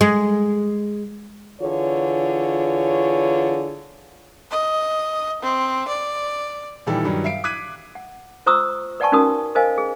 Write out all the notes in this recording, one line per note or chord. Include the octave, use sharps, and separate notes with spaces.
G#3
D3 E3 F4 G#4 C#5
D#5
C4
D5
A#2 D#3 E3 G3 A4
G2 D#3 F#3 G3
E5 F5 C7 D7
D6 F#6 G#6 B6 D#7
F#5
F4 C5 A#5 C#6 D#6 E6
B4 D5 F#5 G#5 A5 C#6
C#4 D#4 F#4 A#4 D#6
A#4 C5 D#5 F5 G#5
G#4